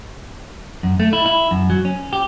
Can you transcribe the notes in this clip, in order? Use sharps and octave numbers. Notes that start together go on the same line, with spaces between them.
F#2
A3
E4
E4
F#2
F#3
C#4
G4